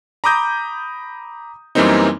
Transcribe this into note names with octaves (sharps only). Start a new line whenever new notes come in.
A#5 B5 D6 D#6 G6 A#6
F#2 E3 G3 A#3 C4 D#4